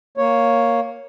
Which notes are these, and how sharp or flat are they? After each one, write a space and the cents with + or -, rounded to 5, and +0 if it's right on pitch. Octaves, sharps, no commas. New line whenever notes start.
A#3 +0 C#5 +0